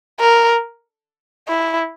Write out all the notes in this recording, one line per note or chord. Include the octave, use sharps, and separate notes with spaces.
A#4
E4